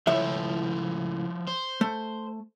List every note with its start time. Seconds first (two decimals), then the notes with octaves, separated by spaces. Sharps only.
0.07 C#2 A2 F3 E4 E5
1.47 C5
1.81 A3